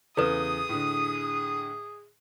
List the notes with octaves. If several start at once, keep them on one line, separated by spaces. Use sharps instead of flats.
E2 C#3 G#4 A4 B4 D#6
A2 D3